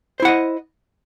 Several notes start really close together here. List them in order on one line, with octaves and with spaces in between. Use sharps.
C5 E4 F#5 D#5